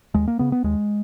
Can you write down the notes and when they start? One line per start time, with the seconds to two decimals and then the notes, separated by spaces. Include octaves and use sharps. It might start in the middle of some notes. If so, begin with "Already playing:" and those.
0.14 D#2 G#3
0.28 A#3
0.39 C#3 B3
0.52 B3
0.64 D#2 G#3